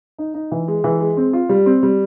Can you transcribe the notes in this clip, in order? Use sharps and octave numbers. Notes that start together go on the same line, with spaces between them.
D#4
D#4
E3
G#3
E3
G#3
C4
F4
G3
C4
G3